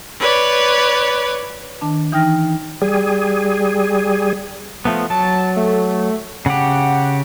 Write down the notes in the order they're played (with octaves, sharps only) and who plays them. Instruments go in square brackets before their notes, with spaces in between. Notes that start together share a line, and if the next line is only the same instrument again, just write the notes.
[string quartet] B4 C#5 D5
[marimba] D#3 D4 A5
E3 D#4 G5 F6 A#6
[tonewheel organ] G3 G#4
[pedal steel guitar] F3 A3 B3
[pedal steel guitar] F#3 [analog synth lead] A5
[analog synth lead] A3
[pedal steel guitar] C#3 G4 [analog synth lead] F#5